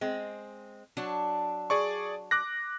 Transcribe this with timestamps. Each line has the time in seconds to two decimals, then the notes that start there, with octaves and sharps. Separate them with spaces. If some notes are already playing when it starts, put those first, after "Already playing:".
0.01 G#3 C4
0.97 F#3 D4 A5
1.70 G#4 D5 C#6
2.31 D6 F#6 A#6